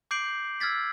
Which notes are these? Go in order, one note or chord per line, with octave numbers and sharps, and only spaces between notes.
D6 G6 C7 D7 F#7
E6 F6 G#6 A6 B6